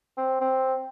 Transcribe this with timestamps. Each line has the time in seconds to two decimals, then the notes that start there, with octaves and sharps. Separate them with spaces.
0.18 C4
0.41 C4